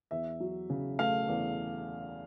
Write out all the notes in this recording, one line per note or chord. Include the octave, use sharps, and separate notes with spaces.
E2 E5
F#3
C#3
A3 F5
E2